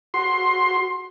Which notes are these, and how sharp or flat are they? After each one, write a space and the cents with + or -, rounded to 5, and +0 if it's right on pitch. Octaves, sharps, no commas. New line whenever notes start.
F#4 +0 C6 +15